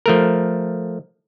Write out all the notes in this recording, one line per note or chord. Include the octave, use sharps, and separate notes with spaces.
F3 A3 A#4